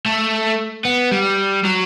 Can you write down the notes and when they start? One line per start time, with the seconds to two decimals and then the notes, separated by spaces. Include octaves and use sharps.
0.06 A3
0.85 B3
1.12 G3
1.65 F#3